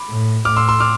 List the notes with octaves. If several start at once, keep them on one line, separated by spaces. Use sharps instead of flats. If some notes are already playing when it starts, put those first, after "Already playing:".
Already playing: B5 D6
A2
A2 D6 F6
C6 E6
C6 E6
D6 F6